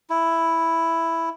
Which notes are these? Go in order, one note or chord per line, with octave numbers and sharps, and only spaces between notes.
E4